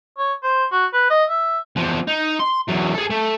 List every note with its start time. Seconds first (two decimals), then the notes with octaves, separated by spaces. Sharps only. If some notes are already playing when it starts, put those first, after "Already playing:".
0.18 C#5
0.43 C5
0.72 F#4
0.94 B4
1.11 D#5
1.30 E5
1.76 E2 F3
2.08 D#4
2.40 C6
2.69 E2 F#3
2.95 G#4 A4
3.10 A3